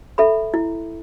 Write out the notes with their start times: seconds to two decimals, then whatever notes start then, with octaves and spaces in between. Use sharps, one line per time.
0.18 A4 E5 B5
0.54 E4